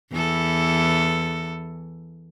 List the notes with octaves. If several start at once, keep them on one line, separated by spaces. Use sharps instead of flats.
E2 E3 A4